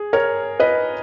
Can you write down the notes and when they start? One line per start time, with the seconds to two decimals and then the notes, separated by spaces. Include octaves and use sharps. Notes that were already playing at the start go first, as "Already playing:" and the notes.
Already playing: G#4
0.13 A#4 C#5
0.60 B4 D#5